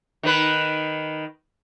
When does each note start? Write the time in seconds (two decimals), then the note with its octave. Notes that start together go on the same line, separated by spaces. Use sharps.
0.23 D#3 D#4 B4